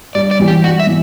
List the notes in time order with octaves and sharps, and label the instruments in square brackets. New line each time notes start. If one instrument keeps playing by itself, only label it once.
[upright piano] G2 [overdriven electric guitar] D5
[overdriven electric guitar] D5
[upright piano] E3 G3
[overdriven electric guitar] G4
[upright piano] G2 [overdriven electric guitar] F#4
[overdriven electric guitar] E5
[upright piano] E3